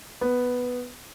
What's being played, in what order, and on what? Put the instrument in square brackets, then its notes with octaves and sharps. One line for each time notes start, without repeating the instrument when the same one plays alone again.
[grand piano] B3